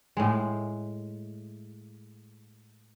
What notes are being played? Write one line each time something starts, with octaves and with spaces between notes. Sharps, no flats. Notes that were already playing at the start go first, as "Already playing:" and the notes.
A2 G#3